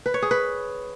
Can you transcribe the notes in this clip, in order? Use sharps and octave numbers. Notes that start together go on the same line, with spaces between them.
B4
C#5
G#4
B4